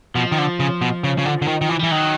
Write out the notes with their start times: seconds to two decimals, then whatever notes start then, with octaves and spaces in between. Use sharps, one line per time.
0.15 B2 F3
0.32 D#3
0.38 D3
0.60 C#3
0.82 B2
1.04 C#3
1.18 C#3
1.25 D3
1.42 D3
1.48 D#3
1.61 D#3
1.69 E3
1.79 E3 G3
1.90 D#3 F#3